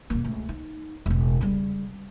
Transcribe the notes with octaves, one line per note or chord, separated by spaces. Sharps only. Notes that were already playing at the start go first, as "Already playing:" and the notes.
D#1 A#3
C#2 A3
D#4
E1 A1
C#3 G3